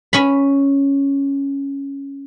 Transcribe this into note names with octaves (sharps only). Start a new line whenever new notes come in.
C#4 B5